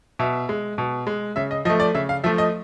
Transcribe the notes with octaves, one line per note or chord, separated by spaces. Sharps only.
B2 E5
G#3
B2
G#3
C#3 E5
D#5
F3 A3 D#5
D5
C#3 E5
F5
F3 A3 E5
D#5